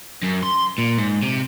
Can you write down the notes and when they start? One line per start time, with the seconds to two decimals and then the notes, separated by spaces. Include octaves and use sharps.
0.22 F#2
0.43 C6
0.78 A#2
0.98 G#2
1.23 C3